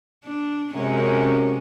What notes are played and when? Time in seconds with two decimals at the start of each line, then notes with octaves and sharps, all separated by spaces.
0.24 D4
0.74 F#2 C3 G#3 C#4